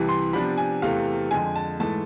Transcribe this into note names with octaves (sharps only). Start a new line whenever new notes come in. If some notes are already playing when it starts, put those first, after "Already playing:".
Already playing: C2 C3 E3
C6
C3 F3 B3 D4 B5
G#5
E2 C3 E3 A3 F5
F2 D3 G#3 G#5
A5
G#2 E3 A3 A5